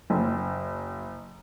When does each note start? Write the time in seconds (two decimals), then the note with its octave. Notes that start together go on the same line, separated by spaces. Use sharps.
0.10 F#1